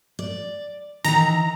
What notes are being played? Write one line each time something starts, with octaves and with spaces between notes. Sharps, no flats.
D5
D#3 E3 A#5